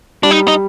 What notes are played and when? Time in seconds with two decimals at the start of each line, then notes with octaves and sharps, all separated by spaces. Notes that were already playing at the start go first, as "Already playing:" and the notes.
0.23 G3 D4
0.31 D#4
0.48 D#4